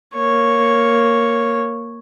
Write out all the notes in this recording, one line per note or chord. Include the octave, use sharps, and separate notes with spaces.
A#3 C#5